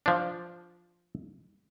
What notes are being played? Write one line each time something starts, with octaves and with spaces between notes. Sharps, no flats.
F3 D4